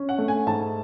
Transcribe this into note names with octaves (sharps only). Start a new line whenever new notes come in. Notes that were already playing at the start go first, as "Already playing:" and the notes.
Already playing: C#4
F#5
A3
G#5
G#2 A5